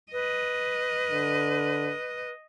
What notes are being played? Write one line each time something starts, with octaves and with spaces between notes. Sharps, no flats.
B4 D#5
D3